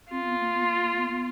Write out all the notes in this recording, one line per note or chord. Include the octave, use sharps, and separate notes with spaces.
C4 F4
B3
A#3
B3
A#3
A#3
B3
B3